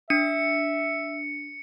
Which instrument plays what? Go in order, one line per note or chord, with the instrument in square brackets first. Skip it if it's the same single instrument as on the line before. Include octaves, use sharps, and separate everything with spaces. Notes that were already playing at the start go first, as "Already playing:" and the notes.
[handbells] D4 [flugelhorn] E5 [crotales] C#7